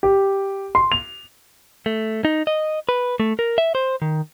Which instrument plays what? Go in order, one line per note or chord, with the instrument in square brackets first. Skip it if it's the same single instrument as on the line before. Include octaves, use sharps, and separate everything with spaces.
[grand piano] G4
C6
F7
[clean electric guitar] A3
D#4
D#5
B4
A3
A#4
E5
C5
D#3